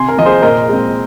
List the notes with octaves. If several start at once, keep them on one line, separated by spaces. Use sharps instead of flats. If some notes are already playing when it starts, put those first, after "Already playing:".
Already playing: C3 G#5 C6
A#4
F3 A#3 D#5
G#4 C5
A#2 A#4 D#5
G#3 C4